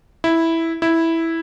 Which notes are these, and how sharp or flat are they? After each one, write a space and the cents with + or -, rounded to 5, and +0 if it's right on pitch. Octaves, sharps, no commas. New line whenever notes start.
E4 -5
E4 -5